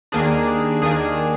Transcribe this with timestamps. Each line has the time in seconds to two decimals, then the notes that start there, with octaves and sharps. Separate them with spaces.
0.12 D#2 D#3 A#3 D4 G#4
0.82 D#2 D#3 A#3 D4 G#4